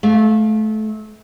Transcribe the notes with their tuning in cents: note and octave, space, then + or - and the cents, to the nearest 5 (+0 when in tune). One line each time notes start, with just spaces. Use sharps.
A3 -25 F5 +0